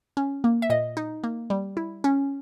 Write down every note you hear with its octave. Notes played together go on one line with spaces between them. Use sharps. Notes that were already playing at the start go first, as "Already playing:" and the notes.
C#4
A#3
E5
A#2 D#5
D#4
A#3
G3
E4
C#4